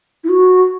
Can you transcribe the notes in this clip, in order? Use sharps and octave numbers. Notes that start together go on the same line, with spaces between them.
E4
F#4